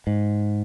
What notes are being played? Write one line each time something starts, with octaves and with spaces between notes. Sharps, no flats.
G#2